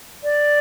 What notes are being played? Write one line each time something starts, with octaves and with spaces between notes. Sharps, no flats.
D5